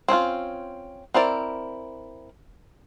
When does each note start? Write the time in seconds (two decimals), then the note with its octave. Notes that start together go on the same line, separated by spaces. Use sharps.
0.08 C4 C#4 D#4 F4
1.14 C4 E4 A#4 D5